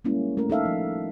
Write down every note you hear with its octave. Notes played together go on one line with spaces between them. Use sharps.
G3 G#3 A#3 C#4 E4
A3 C#4 A#4
D#4 A4 E5 F5
F3